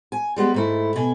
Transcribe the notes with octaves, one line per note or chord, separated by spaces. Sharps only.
G#5
G3 G#3 B3 G4
G#2 A3 E4
B2 G#5